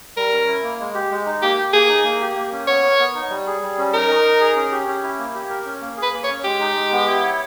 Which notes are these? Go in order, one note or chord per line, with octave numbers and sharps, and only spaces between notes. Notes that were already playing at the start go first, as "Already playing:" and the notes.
G3 A#4
C#4
E4
A#3
G#3
G4
G#3
D#4
A#3 G4
G4
A#3 G#4
D#4
A#3
G4
A#3
C#4
B3 C#5
A#4
B3
D#4
G3
G#4
G3
C#4
D#4 A#4
D#5
D#4
G#4
C#4
G4
C#4
E4
A#3
G4
A#4
C#4
A#3
G#4
B4
A#3
C#5
C#4
G#3 G4
D#4
G#3
B3
E4
C#5